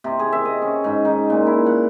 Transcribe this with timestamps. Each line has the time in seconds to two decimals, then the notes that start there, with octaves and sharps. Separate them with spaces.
0.04 C3
0.19 G#4
0.32 E5
0.45 D#5
0.62 C#4
0.84 G#2
1.05 D#4
1.30 A#2
1.47 E4
1.66 F#5